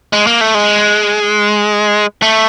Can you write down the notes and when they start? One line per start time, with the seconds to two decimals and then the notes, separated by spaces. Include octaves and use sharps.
0.13 G#3
0.27 A#3
0.41 A3
0.54 G#3
2.22 A3